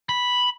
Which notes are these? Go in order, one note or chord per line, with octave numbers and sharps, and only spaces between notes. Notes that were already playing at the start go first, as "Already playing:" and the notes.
B5